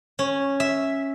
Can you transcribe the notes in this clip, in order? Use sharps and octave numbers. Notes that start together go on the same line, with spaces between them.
C#4
E5